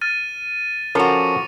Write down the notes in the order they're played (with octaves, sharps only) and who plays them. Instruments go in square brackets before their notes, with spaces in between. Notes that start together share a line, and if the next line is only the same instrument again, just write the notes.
[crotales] F6 A6 D#7
[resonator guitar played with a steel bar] F3 F#4 [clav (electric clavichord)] C#4 A4 A#4 [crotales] D6 C#7 F7